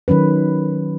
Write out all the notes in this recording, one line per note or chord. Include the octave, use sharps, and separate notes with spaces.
D#3 F#3 C#4 B4